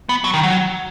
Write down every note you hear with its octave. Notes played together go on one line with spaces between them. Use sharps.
B3
F#3
D#3
F#3